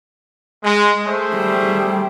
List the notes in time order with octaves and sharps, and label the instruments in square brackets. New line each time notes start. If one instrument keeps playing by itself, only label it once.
[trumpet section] G#3
A3 G#4 C5
[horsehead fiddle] G3